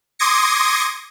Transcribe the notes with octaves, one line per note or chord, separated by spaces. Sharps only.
C6 D6 D#6 G#6 A#6 C#7